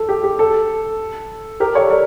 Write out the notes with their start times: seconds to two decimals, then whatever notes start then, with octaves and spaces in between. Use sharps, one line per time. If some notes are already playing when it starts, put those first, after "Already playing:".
Already playing: A4
0.09 G4
0.24 G4
0.39 A4
1.60 G4 A#4
1.75 A4 C#5
1.91 A#4 D5